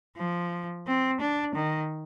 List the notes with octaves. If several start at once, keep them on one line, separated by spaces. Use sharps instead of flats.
F3
C4
D4
D#3